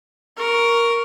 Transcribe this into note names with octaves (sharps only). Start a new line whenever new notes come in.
A#4 C#6